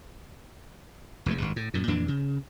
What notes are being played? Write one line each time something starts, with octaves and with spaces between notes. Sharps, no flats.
F1 E2 A#2 A3
G#1 G2
A2
F#2 A#2
F2 A#2 E3 D4
C#3